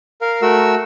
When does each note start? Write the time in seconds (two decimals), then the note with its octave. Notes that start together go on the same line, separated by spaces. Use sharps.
0.21 A#4 F5
0.42 A3 F#4 A#4 E6